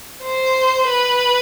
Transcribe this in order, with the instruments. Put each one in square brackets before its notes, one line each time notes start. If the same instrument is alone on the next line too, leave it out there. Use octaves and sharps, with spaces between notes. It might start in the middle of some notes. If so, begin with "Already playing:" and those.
[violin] C5
B4